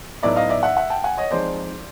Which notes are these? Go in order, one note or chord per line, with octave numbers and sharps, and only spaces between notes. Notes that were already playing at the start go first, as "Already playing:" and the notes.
A2 F#3 B3 D#4 D5 E5
D#5 F5
D5 E5
E5 F#5
E5 F#5
G5 A5
F#5 G#5
C#5 D#5
F3 G#3 C4 D#4 C5 D5